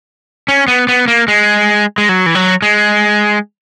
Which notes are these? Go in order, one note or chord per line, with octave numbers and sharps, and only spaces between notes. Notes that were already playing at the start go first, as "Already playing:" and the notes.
C#4
B3
B3
A#3
G#3
G#3
F#3
E3
F#3
G#3